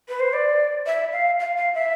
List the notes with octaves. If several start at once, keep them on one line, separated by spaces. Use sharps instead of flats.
B4
C5
D5
E5
F5
F5
F5
E5